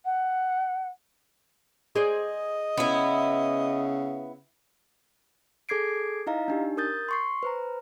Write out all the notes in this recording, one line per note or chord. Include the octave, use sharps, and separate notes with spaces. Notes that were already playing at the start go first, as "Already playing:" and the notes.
F#5
G#4 C5 D5 D#5
C#3 B3 E4
G#4 A4 D6 G#6 C7 D7
D#4 E4 D#5 F5 A#5
D4 D#4 G4
A#4 D#6 G6 A6
C6 C#6 C7
B4 C5 A#5